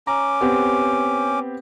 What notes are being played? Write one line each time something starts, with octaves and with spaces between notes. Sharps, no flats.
C#4 A#5 D6
B3 C4 G4